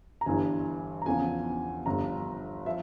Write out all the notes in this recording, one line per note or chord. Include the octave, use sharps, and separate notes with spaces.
A#5
G1 G2 E3 G#5
A#5
E2 C#3 F3 G#5
G1 G2 F3 A#5
F3 E5